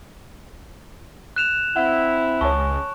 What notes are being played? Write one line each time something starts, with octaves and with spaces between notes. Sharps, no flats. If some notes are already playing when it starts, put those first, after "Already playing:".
F#6 E7 F7
C4 E4 F#5
C#2 C#5 G#5 A5 C#6